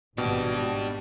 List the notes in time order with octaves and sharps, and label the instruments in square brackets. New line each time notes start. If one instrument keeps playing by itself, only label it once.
[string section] G#1 [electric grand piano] B2 [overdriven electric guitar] D4 G4